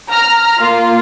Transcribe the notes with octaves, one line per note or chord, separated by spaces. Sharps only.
A#5 F6
A#3 F4